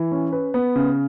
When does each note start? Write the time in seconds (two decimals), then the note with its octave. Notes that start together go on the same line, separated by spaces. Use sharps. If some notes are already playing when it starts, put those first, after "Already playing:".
Already playing: E3
0.12 C#4
0.32 B4
0.54 B3
0.76 C#3